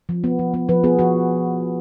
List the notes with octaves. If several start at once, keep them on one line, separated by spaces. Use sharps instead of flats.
F3
B3
F3
B3
F3 B4
B3 G#4
F3 F#4